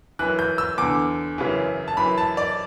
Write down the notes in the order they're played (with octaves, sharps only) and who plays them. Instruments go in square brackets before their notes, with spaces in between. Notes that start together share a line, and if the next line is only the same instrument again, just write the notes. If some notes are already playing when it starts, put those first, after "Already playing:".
[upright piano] F#2 E3 F#6
G6
E6
E2 D3 D6
F#2 C#3 E3
A5
F#2 E3 B5
A5
D5